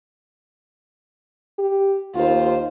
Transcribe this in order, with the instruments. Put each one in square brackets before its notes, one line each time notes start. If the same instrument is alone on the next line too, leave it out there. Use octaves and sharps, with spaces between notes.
[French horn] G4
[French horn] D#2 [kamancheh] F4 C5